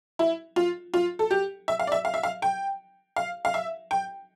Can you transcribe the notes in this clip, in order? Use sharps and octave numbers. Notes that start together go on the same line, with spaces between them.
E4
F4
F4
A4
G4
E5
F5
D5
E5
F5
E5
F5
G5
F5
F5
E5
G5